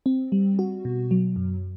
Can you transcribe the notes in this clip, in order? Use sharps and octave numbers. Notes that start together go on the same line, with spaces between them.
C4
G3
F#4
B2
F#3
F#2